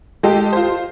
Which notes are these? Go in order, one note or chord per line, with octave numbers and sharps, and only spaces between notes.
G#3 G4 A4
F4 C5